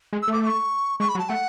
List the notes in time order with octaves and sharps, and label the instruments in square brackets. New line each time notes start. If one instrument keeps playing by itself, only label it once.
[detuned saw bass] G#3
[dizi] E6
[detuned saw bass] A3 [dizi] D6
[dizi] D6
C#6
[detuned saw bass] G#3 [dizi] C#6
[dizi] B5
[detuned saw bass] F#3
[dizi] A5
[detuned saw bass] A3 [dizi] F#5